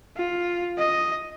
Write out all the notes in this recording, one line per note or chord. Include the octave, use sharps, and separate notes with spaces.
F4
D#5